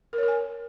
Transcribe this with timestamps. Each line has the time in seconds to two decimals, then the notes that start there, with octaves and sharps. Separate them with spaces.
0.13 A#4
0.18 C#5
0.23 A#4
0.28 G#5